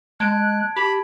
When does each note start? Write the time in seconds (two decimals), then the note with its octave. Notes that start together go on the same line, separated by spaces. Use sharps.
0.20 G#3 A5 F#6 G#6 D7
0.76 G4 A5 B5